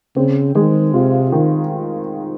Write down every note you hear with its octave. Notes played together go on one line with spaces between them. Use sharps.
C#3 C4
D#3 G#3
C3 F4
D#3